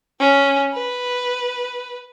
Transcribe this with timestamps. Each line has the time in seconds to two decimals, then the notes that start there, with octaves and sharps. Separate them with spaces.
0.20 C#4
0.73 B4